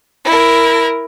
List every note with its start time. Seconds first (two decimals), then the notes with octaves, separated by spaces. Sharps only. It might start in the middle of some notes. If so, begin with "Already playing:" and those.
0.25 E4 A#4